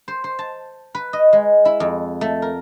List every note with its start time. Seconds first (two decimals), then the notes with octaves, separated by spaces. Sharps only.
0.08 C5
0.24 C5
0.39 A5
0.95 B4
1.13 D#5
1.33 G#3
1.65 E4
1.80 F2
2.21 A3
2.42 A#4